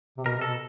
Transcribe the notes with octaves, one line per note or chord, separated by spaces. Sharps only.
C3
B2 A#4
C3
A4
B2